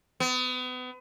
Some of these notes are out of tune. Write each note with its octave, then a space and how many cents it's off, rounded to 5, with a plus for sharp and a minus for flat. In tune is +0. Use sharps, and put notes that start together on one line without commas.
B3 +35